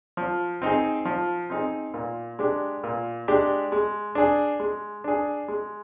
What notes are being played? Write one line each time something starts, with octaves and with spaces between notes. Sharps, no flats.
F3
C4 D#4 G#4
F3
C4 D#4 G#4
A#2
G#3 D4 G4
A#2
G#3 D4 G4
G#3
D4 G#4
G#3
D4 G#4
G#3